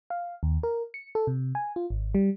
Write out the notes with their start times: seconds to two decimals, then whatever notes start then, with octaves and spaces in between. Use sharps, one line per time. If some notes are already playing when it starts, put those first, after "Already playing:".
0.10 F5
0.43 D#2
0.63 A#4
0.94 C#7
1.15 A4
1.27 C3
1.55 G#5
1.76 F4
1.90 G#1
2.15 G3